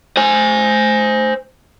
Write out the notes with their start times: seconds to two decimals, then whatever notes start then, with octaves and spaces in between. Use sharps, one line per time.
0.17 C5 G#5